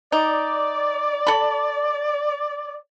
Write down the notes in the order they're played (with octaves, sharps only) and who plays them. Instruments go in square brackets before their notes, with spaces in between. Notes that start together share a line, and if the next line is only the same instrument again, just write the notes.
[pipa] D#4 [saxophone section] D5
[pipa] A4 B5